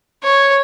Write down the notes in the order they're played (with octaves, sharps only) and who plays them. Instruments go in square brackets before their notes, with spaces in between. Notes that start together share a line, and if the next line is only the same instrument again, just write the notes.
[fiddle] C#5